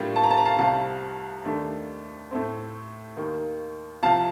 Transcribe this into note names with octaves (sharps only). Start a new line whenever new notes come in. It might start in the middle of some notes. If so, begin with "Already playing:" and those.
Already playing: A2 G3 A#3 D4 F4
A5
A#5
A5
A#5
F5 A5
C2 C3 G3 F5 A5
D#2 D#3 A3 D4
A2 A3 C4
D#2 D#3 A#3
C2 C3 F3 F5 A5